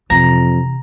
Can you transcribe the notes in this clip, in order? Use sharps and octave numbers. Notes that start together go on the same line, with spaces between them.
F2 C3 E3 A#5